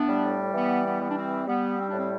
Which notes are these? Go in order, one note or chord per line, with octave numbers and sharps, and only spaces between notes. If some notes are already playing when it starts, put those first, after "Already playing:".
Already playing: A2 B3 D4
G3
E3 B3
B3
G3
D4
C4
G3 B3
C4
D4
A2 C4